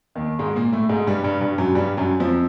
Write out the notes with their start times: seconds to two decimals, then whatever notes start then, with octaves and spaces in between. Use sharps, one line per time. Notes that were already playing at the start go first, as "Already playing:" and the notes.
0.15 D#2 D#3
0.39 G#2 G#3
0.56 A#2 A#3
0.72 A2 A3
0.89 G#2 G#3
1.07 G2 G3
1.24 G2 G3
1.41 G2 G3
1.58 F#2 F#3
1.75 G2 G3
1.97 F#2 F#3
2.20 F2 F3